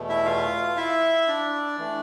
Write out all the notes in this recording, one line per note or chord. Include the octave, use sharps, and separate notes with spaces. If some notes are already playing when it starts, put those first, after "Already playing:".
Already playing: E2 B2 A3
E4 E5
F4 F5
E4 E5
D4 D5
E3 A3 D4